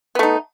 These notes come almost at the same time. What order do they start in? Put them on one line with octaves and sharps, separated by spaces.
B3 A3 D#4